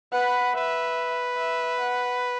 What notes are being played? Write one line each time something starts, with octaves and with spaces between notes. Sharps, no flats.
B4 F#5
B4 E5
E5
F#5